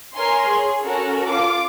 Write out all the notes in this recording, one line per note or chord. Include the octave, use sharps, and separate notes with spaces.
A#4 C#5 G#5 C6
G#4
C#4 F#4 A4 A#4
F4 D6